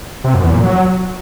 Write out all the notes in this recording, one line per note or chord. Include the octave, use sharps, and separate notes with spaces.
C3
F#2
E2
A#2
F#3